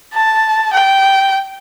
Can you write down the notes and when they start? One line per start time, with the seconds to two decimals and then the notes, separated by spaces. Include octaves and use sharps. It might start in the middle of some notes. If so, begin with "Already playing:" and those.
0.14 A5
0.73 G5